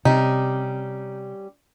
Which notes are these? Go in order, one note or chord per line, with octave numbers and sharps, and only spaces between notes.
C3 G3 C#4 D#4 G4